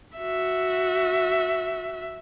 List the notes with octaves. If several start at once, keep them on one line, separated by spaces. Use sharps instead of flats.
F#4 E5